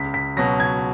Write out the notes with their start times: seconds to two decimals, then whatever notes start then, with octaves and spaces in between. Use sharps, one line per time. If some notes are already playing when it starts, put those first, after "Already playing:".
Already playing: C#2 B6
0.14 B6
0.37 B2 F#3 A#6
0.60 G#6